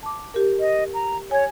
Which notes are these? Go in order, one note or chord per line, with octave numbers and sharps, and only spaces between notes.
A5 D6
G4 A#4
D#5
A#5
C#5 G#5 G#6